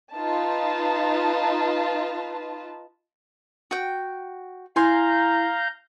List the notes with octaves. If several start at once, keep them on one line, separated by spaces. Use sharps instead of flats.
D#4 F4 B4 A5
F#4 G5
E4 F5 G#5 A#5 C6 G6